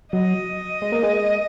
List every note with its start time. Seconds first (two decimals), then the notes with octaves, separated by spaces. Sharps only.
0.13 F#3 D#5
0.82 G#3
0.92 A#3
1.03 G#3